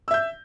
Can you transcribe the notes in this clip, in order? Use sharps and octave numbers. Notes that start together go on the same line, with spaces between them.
E5 E6 G6